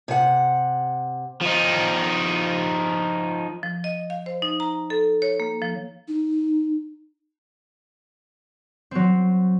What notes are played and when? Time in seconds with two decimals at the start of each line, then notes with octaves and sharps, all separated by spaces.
0.08 C3 F#5
1.41 F3 D#4
3.63 F3
3.84 D#5
4.10 F5
4.26 C5
4.42 D#4
4.60 A#5
4.90 A4
5.22 C#5
5.40 A#3
5.62 F3
6.08 D#4
8.91 F#3 C4